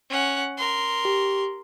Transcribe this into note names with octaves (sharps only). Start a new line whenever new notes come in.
C#4 F#5
A#4 C6
G4